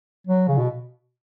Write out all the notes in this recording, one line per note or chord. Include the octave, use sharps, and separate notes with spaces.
F#3
C#3
B2